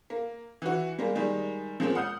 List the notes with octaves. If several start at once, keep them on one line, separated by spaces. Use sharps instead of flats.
A#3
E3 F#4
G3 G#3 A#3
D#3 G3 G#3
F3 G#3 A#3 C4 C#4
F#5 D#6 F6 G6